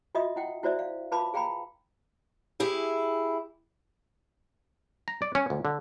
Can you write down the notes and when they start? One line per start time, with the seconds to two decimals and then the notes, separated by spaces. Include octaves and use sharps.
0.15 F4 F#4 D#5 E5 D#6
0.36 E4 F#5 G5
0.63 E4 F#4 C5 D5 E5
0.79 F5
1.12 F4 B4 F5 A5 B5 D6
1.34 G#4 F5 G5 A#5 B5
2.60 E4 G4 G#4
5.08 A#5
5.22 D5
5.35 C#4
5.50 D2
5.65 D3